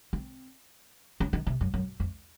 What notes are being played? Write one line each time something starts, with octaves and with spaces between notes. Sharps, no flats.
C4
C#4
D#3
C3
F#2
F#2
F2